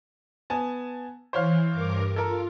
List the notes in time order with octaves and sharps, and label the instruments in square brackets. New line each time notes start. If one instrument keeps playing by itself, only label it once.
[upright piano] B3 G#5 A5
[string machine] E3 [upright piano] C5 C#5 F5
[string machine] G2 A#4 D6
[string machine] F4 [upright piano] A4 A#4